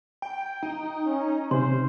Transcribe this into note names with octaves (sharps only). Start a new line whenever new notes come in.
G5
D#4
C#4
C3 C5 C6